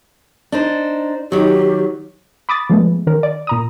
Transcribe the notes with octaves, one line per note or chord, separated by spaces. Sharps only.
D4 D#4 C5
D#3 F#3 G4
B5 D6 D#6 A6
F3 G#3 A3 B3
D#3 A#4
D5
A#2 A#5 D#6